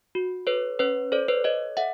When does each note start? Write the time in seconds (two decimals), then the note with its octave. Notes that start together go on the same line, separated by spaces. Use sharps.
0.15 F#4
0.47 A4 B4 C#5
0.79 C#4 B4 C#5
1.12 A4 C5 D5
1.28 B4 C#5
1.44 A4 C#5 D#5
1.77 A4 E5 F#5